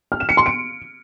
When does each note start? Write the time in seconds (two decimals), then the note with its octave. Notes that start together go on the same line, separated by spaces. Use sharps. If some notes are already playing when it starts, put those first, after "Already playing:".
0.12 F6
0.20 E7
0.29 C#7
0.37 C6
0.46 D7